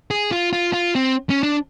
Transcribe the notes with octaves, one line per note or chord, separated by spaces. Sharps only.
G#4
F4
F4
F4
C4
C#4
D4